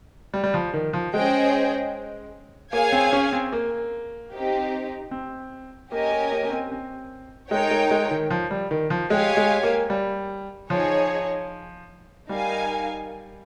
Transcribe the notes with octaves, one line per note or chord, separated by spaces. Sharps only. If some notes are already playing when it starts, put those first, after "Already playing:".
G3
G3
F3
D#3
F3
G#3 C#4 G#4 C5 D#5 G5
A#3 G#4 C#5 F5 G#5
C4
C#4
C4
A#3
C4 D#4 G4
C4
A#3 C#4 G4 A#4 D#5 G#5
A#3
A#3
A#3
C4
C4
G#3 D#4 A#4 C#5 G5
G#3
G#3
D#3
F3
G3
D#3
F3
G#3 G4 C#5 F5 G#5
G#3
A#3
G3
F3 D#4 G#4 C#5
G3 D#4 A#4 F5 G#5